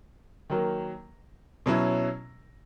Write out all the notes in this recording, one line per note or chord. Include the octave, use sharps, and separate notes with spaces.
D#3 F#3 A#3
B2 F#3 C#4 E4